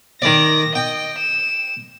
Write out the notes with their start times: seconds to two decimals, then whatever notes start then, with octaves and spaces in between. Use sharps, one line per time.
0.22 D#3 D5 A#6
0.75 D#5 G5
1.18 E7